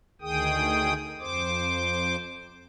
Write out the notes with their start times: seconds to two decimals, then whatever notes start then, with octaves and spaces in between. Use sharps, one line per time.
0.21 D2 D#3 G#4 G5 D#6
1.20 F2 C5 D6